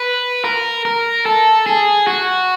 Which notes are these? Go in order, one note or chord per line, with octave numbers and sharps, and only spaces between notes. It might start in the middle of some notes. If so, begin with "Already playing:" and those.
Already playing: B4
A#4
A#4
A4
G#4
F#4